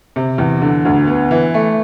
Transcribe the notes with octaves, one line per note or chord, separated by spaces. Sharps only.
C3
E2
D3
D2
B3
E3
A3